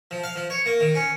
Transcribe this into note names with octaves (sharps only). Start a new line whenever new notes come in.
F3
F5
F3
C#5
A#3
D#3
C#4